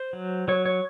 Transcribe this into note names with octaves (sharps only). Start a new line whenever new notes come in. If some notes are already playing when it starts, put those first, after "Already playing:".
Already playing: C5
F#3
F#3 C#5
C#5